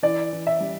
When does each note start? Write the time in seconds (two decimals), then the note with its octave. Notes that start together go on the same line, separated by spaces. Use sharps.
0.03 E3 D5
0.32 E3
0.47 E5
0.60 G3